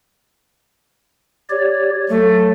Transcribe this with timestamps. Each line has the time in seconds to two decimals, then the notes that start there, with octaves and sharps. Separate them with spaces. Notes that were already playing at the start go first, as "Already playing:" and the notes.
1.50 G4 C#5 D5
2.09 F#3 A3